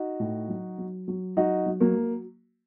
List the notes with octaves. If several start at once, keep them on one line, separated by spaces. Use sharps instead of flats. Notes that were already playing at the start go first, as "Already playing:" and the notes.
Already playing: D#4 F#4
A2
F#3
F#3
F#3
F#3 D#4 F#4
F#3
F#3 A#3
F#3